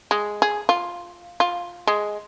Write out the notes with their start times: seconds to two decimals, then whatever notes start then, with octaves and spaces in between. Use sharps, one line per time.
0.11 G#3
0.42 G#4
0.69 F4
1.40 F4
1.87 G#3